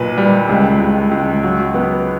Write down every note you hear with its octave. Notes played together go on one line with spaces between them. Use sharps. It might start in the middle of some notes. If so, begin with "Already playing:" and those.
Already playing: B1 A#2 B4
G3
C#2
C#2
C#2
F#3
B3